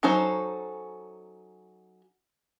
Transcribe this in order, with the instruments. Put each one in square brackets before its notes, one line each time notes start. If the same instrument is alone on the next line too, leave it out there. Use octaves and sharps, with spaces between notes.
[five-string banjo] F#3 C#4 D#4 A4 C5